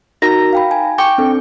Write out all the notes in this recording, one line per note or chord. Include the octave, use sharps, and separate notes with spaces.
D#4 F#4 A#4 A#5
F5 G5 B5
G#5
G5 C#6 D6
C4 D4 A4